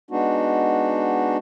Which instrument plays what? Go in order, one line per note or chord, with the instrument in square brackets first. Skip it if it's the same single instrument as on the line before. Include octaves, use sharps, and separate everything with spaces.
[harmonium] G#3 B3 D4 D#4 F#4